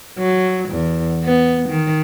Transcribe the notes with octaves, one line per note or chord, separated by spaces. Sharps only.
F#3
E2
B3
D#3